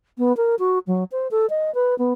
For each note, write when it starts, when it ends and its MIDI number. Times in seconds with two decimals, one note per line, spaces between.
0.18 0.35 59
0.37 0.55 70
0.59 0.79 66
0.87 1.04 54
1.12 1.28 72
1.31 1.49 69
1.50 1.73 75
1.75 1.97 71
1.98 2.13 59